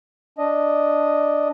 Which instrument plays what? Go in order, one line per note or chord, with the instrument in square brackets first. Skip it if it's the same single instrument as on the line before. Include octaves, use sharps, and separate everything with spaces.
[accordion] D4 D#5